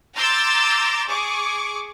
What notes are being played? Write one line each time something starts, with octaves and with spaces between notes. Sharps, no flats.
A#5 C6 D6 E6 G6 A6
G#4 C#6 D6